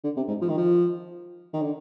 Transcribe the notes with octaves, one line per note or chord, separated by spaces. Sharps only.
D3
C3
G#2
F3
D#3
F3
D#3
D3